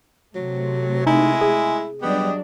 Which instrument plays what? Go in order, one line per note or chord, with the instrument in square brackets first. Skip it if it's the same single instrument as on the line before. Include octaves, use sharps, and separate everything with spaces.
[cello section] C3 A3 [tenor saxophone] F#3
[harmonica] G#3 G#5 [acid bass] D#4 [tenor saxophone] E4
[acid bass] G#4
[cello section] F#3 G3 D4 [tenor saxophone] B3 [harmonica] G4 D#5